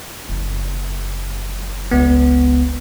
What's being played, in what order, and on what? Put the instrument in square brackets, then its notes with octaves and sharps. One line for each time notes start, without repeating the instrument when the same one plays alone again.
[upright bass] F#1 F#2
[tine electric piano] C#2 B3